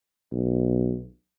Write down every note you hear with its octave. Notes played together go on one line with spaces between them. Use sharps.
B1